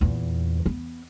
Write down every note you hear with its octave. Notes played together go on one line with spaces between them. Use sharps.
E2 A#2
B3